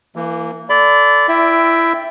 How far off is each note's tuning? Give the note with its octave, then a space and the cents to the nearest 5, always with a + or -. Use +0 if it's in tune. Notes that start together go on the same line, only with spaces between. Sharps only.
E3 +20 A#3 -25
A4 +0 D5 -15 B5 +30
E4 +20 E5 +0 G5 +0